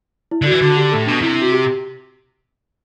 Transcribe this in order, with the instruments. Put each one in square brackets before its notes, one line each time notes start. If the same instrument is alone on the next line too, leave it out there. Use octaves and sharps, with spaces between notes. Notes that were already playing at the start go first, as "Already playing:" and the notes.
[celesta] E4
[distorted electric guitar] D3 [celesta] F#4
[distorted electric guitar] E3
[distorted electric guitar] D3 [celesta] F#4
[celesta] G4
[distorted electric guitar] A2 [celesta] A4
[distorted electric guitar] B2 [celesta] D4
[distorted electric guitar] C3 [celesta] E4
[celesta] E4
F#4
G4